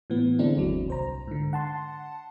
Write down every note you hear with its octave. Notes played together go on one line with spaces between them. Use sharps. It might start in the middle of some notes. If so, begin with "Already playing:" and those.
A2 E3 B3
D3 G#3 A3 C4 D4 E4
G1 D#2 F#3
C2 C5 A#5
G#2 D3
F#5 A5 C6